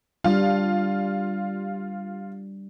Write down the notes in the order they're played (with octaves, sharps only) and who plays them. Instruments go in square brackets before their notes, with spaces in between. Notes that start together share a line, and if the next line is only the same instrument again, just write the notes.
[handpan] G3 D4 [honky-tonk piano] F4